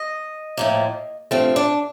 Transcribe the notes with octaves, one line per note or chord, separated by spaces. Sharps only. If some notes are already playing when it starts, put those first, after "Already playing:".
Already playing: D#5
A2 F3 A#3
G2 F3 A3 C4
D4